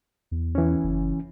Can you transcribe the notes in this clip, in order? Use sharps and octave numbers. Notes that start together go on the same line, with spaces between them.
E2
E3 C#4
F#1